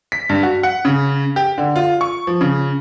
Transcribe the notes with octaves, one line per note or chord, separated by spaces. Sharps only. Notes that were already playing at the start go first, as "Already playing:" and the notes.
B6
G2
F#4
F#5
C#3
G4
D3
F4
C#6
F3
C#3